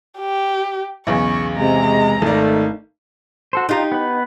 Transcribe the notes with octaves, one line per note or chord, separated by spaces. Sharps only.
G4
B1 E2 C#3 C#6
C3 G#3 A#5
G#1 D#3 A3 D#4 D5
F#4 A4 C5
D4 D#4 F4 G4 A#5
B3 B4